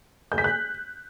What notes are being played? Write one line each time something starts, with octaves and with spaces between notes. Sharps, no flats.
G6
B6
F#6